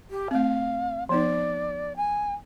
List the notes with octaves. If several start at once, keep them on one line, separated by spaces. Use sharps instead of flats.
G4
A3 C4 F5
F3 B3 D#4 D5
G#5